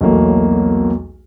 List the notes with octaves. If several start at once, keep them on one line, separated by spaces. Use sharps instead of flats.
B1 E2 F#3 A3 A#3